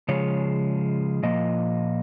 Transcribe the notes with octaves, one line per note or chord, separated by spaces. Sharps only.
C#3 F3 G#3 C#5
A#2 F3 A#3 D#5